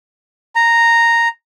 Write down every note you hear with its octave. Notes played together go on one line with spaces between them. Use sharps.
A#5